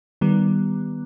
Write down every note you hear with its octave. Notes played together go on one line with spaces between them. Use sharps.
D#3 G3 B3